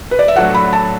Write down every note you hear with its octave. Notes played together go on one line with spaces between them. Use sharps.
B4
D5
E5
A2 F#3 D4 F#4 A4 F#5
B5
A5